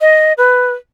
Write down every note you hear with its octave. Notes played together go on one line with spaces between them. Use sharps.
D#5
B4